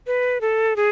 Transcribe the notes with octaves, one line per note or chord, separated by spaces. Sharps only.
B4
A4
G#4